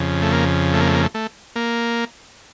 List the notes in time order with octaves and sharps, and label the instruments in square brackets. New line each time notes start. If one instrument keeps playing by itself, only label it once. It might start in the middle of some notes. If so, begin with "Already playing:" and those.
Already playing: [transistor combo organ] F2 C#3
A3
A#3
A3
A#3
A3
A#3
A3
A3
A#3